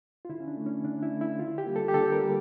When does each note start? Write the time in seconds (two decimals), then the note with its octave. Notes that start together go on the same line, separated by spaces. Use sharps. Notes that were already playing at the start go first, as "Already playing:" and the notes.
0.25 F4
0.30 D3 E4
0.40 C#4
0.48 D4
0.57 A3
0.66 C#4
0.84 D3 D4
1.02 E4
1.12 A3
1.21 E4
1.39 D3 F4
1.58 G4
1.66 G3 A#3
1.76 A4
1.89 G4
1.94 D3 A4
2.12 A#4
2.21 G3 A#3